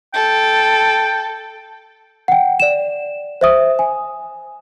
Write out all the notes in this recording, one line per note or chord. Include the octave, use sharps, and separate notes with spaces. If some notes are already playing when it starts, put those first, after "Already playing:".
A4 G5
F#5 G5
D5 E7
C5 E5 D#6
G#5